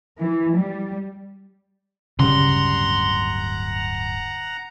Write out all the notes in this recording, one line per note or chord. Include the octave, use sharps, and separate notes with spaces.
E3
G3
D1 G2 C#3 G3 F#5 A#5 C6